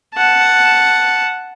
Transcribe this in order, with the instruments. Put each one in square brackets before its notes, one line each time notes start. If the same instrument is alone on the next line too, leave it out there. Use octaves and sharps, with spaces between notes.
[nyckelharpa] F#5 A5